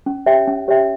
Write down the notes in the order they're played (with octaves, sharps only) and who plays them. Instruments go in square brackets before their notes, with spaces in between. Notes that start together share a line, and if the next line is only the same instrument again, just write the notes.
[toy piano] C#4
G4 C#5 E5 G5
C#4
G4 C#5 E5 G5